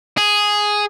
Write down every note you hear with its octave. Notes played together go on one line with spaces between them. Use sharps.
G#4